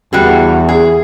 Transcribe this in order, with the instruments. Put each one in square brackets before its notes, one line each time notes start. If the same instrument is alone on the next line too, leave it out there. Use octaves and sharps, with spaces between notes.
[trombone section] E2 [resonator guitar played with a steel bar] G3 F#4 G#4
[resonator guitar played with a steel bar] G#4